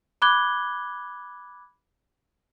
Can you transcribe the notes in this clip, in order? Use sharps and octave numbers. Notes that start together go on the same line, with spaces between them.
B5 D6 F#6 G#6 G7